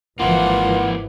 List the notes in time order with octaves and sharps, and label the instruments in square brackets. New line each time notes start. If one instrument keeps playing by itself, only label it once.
[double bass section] G#1 E3 F3 [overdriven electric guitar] A#3 E4 [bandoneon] F4 [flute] F#5